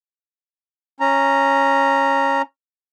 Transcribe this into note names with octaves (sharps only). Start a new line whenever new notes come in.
C#4 A#5